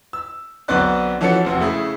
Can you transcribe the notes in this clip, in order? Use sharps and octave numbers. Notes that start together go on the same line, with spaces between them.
E6
B1 D3 B3 C4 D5 F#6
E3 F3 C#4 F#4 A4 C#7
F1 C4 F#4
C#3 A3 E4 G#4